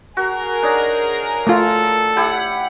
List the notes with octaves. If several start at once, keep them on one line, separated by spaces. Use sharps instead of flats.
F#4 G#4 A#4
D4 D#4 C#5
A3 F4 A4
E4 G4 F#5